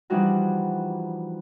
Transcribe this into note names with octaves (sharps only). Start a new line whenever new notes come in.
E3 F3 G3 D4 D#4 F#4